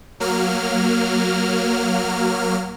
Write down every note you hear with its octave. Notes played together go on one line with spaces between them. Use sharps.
F#3 A#3 F6